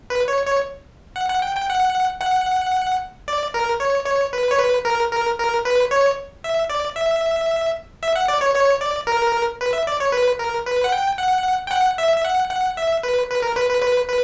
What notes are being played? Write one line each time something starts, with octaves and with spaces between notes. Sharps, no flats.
B4
C#5
C#5
F#5
F#5
G5
G5
F#5
F#5
D5
A#4
C#5
C#5
B4
C#5
B4
A#4
A#4
A#4
B4
C#5
E5
D5
E5
E5
F#5
D5
C#5
C#5
D5
A#4
B4
E5
D5
C#5
B4
A#4
B4
F#5
G5
F#5
G5
F#5
E5
E5
F#5
F#5
E5
B4
B4
A#4
B4
B4
B4
B4